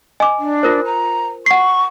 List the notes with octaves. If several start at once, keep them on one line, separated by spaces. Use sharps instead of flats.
D#5 G#5 D6
D4
F4 A#4 C5
A#5
F#5 C#6 C7